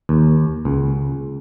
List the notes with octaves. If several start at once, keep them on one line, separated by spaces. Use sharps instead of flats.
D#2
C#2